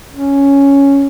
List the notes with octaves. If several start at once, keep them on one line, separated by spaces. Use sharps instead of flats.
C#4